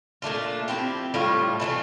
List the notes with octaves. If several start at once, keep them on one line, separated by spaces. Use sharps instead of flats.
A#2 A3 D4 F4
F3 C4 E4 G4
A2 G3 D4 F4
E3 A3 D4 F4